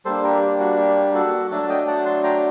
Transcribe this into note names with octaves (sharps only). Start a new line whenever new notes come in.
G3 A#3 D4 A4 C5
G4 A#4
G4
F#4
G4
F#4 A4
F#3 A3 D4 F#4 A4
A5
D#5 G5
G5
F#5 A5
A5 C6
G5 A#5